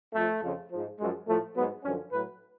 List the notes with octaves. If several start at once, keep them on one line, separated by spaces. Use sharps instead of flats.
F2 F3 A3
F2 C#3 F3
G#2 F3
F#2 F3 G#3
A2 F3 A3
G#2 F#3 B3
F#2 D3 F3 C#4
A2 F#3 B4